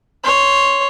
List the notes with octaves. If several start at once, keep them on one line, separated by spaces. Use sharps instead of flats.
C#5 C6